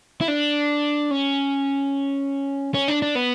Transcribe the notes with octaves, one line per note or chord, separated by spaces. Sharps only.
E4
D4
C#4
C#4
D4
D4
B3